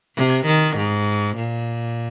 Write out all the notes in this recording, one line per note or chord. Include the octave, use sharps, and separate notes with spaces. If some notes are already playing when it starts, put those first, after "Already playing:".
C3
D#3
G#2
A#2